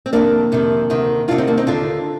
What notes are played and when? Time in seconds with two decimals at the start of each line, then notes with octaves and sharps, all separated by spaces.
0.06 C4
0.13 F2 C3 D#3 A#3 D4
0.52 F2 C3 D#3
0.90 D2 C3 D#3
1.28 D2 C3 D#3 D4 F4
1.38 C4 D#4
1.47 A#3 D4
1.57 C4 D#4
1.67 D#2 D3 D4 F4